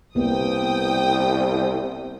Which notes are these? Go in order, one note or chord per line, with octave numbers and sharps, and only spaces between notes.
C2 A#3 B3 G5 D#6